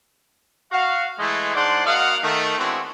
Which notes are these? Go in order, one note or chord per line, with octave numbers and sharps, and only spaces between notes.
F#4 F5
E3 G#3 A3
G#2 D4 D5 F#5 C6
A#3 F#4 D#5 F5 F#5
D#3 A3
G#3 B3 C4 D4 E4 F#4